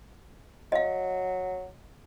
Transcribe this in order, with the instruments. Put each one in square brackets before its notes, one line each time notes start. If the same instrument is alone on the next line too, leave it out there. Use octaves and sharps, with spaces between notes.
[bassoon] F#3 [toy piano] D#5 F5